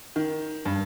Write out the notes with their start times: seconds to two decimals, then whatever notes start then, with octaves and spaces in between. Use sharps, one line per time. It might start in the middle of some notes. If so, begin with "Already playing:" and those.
0.16 D#3
0.65 G2